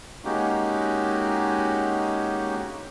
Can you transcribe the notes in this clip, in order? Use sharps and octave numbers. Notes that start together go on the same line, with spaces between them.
G#3 A#3 C#4 D#4 F#4 G4